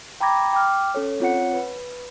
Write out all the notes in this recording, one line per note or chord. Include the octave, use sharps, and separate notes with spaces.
G5 A#5 B5 D6 G#6 A#6
G5 D6 F6
C#4 A4 C#5
C4 F4 C#5 F#5 C#7
B4